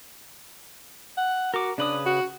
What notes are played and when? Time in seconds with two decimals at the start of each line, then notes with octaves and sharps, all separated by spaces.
1.17 F#5
1.54 F#4 A#4 D6
1.78 C#3 D4 B4 D#6
2.06 F#4